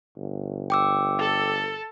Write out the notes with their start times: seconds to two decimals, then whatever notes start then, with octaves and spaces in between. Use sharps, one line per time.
0.17 G1
0.70 G5 D6 E6
1.19 A4